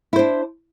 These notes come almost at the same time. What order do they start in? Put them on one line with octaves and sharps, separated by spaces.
E4 C5 D4